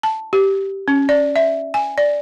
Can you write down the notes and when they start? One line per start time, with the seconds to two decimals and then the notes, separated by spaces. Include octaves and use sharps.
0.03 A5
0.33 G4
0.88 C#4
1.09 D5
1.36 E5
1.74 G#5
1.98 D5